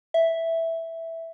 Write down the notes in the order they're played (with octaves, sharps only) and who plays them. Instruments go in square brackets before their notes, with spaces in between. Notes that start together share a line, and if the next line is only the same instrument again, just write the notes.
[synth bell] E5